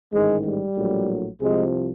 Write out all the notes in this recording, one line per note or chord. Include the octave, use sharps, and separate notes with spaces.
A1 G#2 D#3 G#3
G3
A#1 A2 F#3
C2 C3 F3 G#3